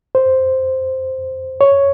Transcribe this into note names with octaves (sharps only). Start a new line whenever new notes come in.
C5
C#5